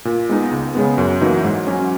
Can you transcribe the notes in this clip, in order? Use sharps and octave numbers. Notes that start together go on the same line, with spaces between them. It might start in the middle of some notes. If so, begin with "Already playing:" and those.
A#2
G#3 B3 D#4
C#2
C#3 G#3 B3
F#2
E3 A#3 D#4 F#4
G#2
F#3 C#4